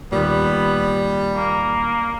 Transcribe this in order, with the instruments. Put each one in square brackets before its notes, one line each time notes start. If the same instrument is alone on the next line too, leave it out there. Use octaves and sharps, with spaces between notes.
[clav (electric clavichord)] D#2 A#2 [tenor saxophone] G3 [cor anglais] B3
[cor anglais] A#3